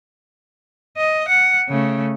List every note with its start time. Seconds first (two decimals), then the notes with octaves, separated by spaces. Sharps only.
0.97 D#5
1.29 F#5
1.69 C#3 A3